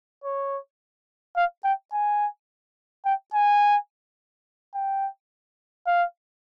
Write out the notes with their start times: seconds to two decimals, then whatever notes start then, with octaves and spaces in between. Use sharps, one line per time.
0.24 C#5
1.36 F5
1.64 G5
1.93 G#5
3.05 G5
3.34 G#5
4.74 G5
5.87 F5